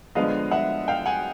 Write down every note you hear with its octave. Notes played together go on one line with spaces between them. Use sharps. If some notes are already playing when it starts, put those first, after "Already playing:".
D3 F3 G#3 B3 D#5 F5
E5 F#5
F5 G5
F#5 G#5